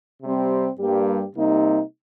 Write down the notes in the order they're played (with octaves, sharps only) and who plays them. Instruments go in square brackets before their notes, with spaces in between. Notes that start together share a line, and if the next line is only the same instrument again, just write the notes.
[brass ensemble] C3 G3 C4
G2 G3 A#3 G4
C3 G3 A#3 D#4